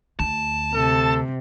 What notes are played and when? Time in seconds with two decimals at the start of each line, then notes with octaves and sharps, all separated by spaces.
0.20 D2 A5
0.74 C3 A4